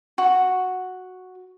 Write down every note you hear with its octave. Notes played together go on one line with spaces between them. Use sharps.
F#4